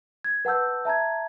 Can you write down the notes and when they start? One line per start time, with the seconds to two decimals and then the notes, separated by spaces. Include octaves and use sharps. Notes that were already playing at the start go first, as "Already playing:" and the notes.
0.24 G#6
0.45 B4 F#5 A5 E6 G6
0.85 E5 A5 A#5 G#6